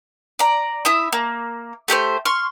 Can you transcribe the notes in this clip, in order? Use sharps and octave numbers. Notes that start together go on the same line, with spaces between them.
D5 A#5
E4 E5 D#6
A#3
A3 G4 A#4 C5
C6 C#6 F6